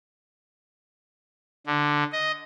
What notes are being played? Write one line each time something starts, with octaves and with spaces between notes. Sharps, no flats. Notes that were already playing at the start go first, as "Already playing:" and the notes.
D3
D#5